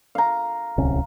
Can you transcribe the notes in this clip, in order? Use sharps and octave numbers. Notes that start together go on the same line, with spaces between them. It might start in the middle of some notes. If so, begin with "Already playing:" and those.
F5 A#5
D1 C2 C#4